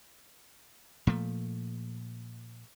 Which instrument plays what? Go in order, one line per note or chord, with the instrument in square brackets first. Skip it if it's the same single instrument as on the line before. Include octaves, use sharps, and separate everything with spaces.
[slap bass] A#2 F3 A3